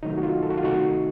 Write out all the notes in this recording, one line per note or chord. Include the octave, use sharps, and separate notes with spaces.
C3 D#3 F#3 A3 D#4
F#4
F4
A4
F#4
F4
C3 D#3 A3 D#4 F#4